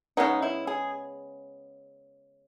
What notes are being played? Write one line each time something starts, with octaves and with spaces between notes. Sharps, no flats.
C#3 E3 G#3 B3 D#4
E4
G#4